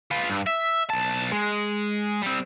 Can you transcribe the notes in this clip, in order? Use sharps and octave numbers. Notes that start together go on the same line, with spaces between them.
F4 B4
G2
E5
B1 A5
G#3
G3 C4